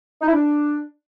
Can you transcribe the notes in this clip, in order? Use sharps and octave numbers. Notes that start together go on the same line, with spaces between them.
D#4
E4
D4